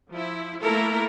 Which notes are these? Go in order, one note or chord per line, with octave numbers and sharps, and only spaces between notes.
F3 E4
A3 A#3 E4 A4 A#4